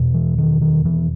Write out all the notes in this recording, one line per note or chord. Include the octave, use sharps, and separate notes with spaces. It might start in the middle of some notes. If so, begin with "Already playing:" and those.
Already playing: E2 B2
E3
D#3
D#3
E3